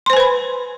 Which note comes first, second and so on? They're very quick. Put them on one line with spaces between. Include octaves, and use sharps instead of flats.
C6 C5 G#5 B4 B5